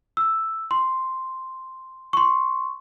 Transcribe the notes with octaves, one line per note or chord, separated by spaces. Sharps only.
E6
C6
C6 C#6